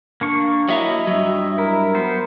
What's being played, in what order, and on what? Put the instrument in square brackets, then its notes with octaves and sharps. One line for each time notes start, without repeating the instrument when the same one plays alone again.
[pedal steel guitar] A#3 D4 C#6
[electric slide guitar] F#3 E5 A#5 [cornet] E4 [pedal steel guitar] D#5
[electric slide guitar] G2 F#3 [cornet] E5
[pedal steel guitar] E4 [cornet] A#4
[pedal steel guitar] B3 C5